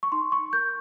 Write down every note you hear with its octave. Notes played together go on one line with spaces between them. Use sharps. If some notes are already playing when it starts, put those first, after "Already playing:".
C#6
D#4 C6
C#6
A#4 G6